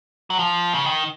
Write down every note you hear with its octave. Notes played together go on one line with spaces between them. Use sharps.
F#3
F3
C#3
D#3